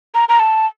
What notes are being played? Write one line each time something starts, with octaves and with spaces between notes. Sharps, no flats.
A#5
A#5
A5